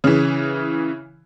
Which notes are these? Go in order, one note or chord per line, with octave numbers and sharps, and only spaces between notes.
C#3 E3